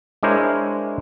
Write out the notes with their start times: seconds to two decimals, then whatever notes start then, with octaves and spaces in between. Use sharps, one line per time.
0.23 G#3 D4 E4 A#4 C5 C#5